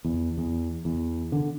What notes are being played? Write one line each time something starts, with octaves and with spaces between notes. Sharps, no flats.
E2
E2
E2
D3